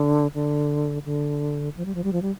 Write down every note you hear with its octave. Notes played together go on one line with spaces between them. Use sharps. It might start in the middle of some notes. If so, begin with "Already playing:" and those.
Already playing: D3
D3
D3
F3
G3
F3
G3
F3
G3